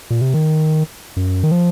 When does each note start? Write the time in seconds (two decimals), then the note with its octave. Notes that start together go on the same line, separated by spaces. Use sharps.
0.10 A#2
0.21 C3
0.34 D#3
1.16 F#2
1.44 D#3
1.51 F3